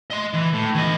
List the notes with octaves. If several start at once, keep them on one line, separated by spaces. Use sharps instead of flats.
D#5 C6
E3
A2
E3 D#5